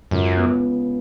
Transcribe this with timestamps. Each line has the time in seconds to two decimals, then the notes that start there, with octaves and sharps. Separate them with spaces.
0.11 C#2 F#2
0.36 B3